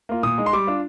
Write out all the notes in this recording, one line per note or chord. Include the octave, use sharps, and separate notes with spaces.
A#3 F4
A#2 D#6
G#3 D#4
C6
G3 D6
D4 F4